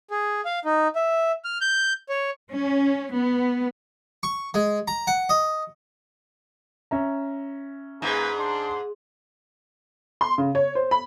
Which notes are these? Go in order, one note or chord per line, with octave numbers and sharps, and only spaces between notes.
G#4
F5
D#4
E5
F6
G6
C#5
C#4
B3
C#6
G#3
A#5
F#5
D#5
C#4 E5 A#5
G#2 A#3 G#4 B4
D4 C6
C6
C#3
C#5
C5
B5